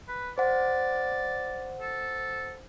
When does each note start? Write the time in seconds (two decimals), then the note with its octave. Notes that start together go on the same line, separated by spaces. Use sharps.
0.08 B4
0.38 C5 D5 F#5
1.81 A4